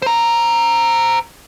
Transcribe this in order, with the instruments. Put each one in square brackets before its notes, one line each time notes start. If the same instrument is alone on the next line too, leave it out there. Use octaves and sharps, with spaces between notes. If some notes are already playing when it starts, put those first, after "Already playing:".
[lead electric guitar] C5 A#5